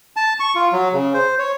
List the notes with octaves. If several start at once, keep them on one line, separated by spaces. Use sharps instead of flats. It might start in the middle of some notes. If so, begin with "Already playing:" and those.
A5
C#6
F4
F#3
C#3
C5
C#5